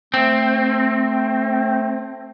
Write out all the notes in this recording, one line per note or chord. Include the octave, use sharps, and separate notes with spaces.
A3 C4